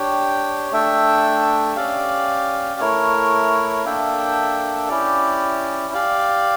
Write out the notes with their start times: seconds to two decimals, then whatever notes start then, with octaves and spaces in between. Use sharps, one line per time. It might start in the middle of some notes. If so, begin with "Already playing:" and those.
Already playing: D4 G4 C#5 G5
0.72 A3 D4 A4 E5 G5
1.76 C#4 G4 D5 F5
2.80 A3 E4 A#4 C#5
3.85 A#3 D4 A4 E5 G5
4.89 C#4 E4 G4 D5
5.94 G4 D5 F5